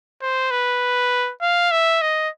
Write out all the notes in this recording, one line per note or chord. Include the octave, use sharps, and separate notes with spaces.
C5
B4
F5
E5
D#5